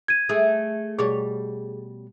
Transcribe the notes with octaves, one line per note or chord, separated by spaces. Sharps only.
G#6 D#7
A3 G#4
B2 G3 G#4 C#5